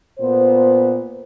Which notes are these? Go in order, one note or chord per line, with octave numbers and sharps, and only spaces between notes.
A#2 B3 C5